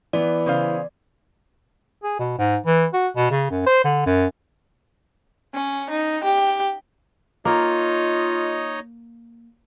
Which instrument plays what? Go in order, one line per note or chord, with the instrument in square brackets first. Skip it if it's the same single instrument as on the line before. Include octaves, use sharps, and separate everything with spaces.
[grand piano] E3 B3 [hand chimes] D5
[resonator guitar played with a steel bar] C#3 C5 F5
[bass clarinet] G#4
B2
G#2
E3
F#4
B2
C#3
F#2
C5
D3
F#2
[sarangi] C#4
D#4
G4
[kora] A#3 [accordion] D#4 C#5 D#5 [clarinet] F4